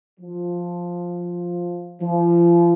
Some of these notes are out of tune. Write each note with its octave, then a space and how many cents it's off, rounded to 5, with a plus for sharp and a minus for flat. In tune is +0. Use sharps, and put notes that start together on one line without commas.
F3 +5
F3 -30